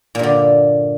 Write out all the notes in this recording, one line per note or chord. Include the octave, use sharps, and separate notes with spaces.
G2 A#2 D3